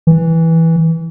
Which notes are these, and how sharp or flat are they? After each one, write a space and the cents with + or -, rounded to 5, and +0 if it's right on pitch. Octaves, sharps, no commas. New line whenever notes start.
E3 -10